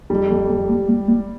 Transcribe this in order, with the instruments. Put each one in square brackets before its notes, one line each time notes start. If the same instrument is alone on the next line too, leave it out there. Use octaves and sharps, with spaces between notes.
[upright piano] F2 [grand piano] G3
[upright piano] F2
F2
G3
G3
G3